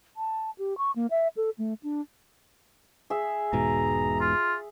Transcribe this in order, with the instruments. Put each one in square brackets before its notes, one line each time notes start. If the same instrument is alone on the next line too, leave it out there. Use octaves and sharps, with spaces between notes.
[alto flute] A5
G4
C#6
A#3
E5
A4
A3
D4
[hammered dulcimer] G#4 E5
[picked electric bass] E1 G#2 B2 [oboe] A#5
[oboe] F4